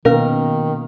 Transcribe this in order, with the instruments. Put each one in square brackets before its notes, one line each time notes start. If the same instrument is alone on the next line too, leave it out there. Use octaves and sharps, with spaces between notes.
[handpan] B2 A#3 [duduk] D#3 [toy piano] C#4 B4 F5 [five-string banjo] A#4